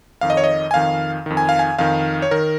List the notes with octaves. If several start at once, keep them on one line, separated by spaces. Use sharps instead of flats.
F2 D#3 F5
D#5
C#5
D#5
G#5
F2 D#3 F5
F2 D#3
G#5
F5
G#5
F2 D#3 F5
C#5
D#3 A#4